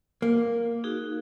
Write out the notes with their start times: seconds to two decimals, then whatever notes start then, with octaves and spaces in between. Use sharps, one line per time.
0.22 A#3
0.84 D#4 F#4 G#4